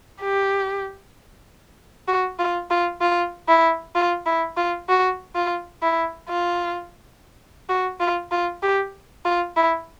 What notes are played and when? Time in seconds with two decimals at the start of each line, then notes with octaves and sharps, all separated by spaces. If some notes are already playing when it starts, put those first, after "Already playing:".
0.21 G4
2.07 F#4
2.39 F4
2.70 F4
3.01 F4
3.48 E4
3.95 F4
4.26 E4
4.57 F4
4.89 F#4
5.35 F4
5.82 E4
6.29 F4
7.69 F#4
8.00 F4
8.31 F4
8.63 G4
9.25 F4
9.56 E4